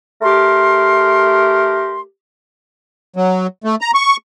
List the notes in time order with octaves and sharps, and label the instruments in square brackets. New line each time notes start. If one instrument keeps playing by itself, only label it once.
[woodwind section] A3 G4 A#4 C6
[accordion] F#3
A3
A#5
C#6